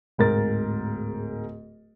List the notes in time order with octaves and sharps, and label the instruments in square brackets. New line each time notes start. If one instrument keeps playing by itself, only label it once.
[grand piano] D1 G#2 A#4 A6